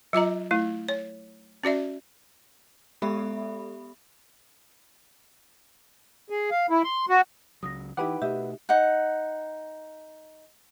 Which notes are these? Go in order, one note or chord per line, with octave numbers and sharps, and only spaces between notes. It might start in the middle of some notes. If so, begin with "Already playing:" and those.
F#3 F4 D#5 A#5
A3 E4
C#5
C#4 F#4 D5 E5
G#3 B3 G4 A4 E5 B5
G#4
F5
E4
C6
F#4
C#2 C#3 F#3 D#6 A#6
E3 D#4 E4 G4 B4 F#5 G5 D6
B2 A3 F#4 G4 D#5 E5
D#4 F#5